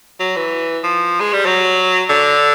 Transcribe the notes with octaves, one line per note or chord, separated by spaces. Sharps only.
F#3
E3
F3
G#3
G3
F#3
D3